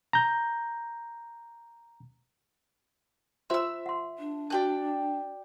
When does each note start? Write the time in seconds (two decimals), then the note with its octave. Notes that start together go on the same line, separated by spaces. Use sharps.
0.13 A#5 G6
3.50 F4 C5 E5 C6 E6
3.86 F#5 C6
4.18 D4
4.50 F#4 D5 G5 A5 F#6